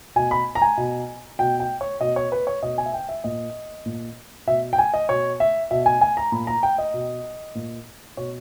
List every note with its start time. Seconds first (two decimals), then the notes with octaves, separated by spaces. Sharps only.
0.16 B2 G#5
0.31 B5
0.55 A#5
0.62 G#5
0.77 B2
1.39 B2 G5
1.60 G5
1.81 C#5
2.01 B2 D#5
2.16 C#5
2.32 B4
2.47 C#5
2.63 B2 D#5
2.78 G#5
2.86 E5
2.94 G5
3.09 E5
3.24 A#2 D#5
3.86 A#2
4.47 B2 E5
4.73 G5
4.78 G#5
4.94 D#5
5.09 B2 C#5
5.40 E5
5.71 B2 E5
5.86 G#5
6.01 G#5
6.17 A#5
6.32 A#2 B5
6.47 A#5
6.63 G5
6.78 D#5
6.94 B2
7.55 A#2
8.17 B2 C#5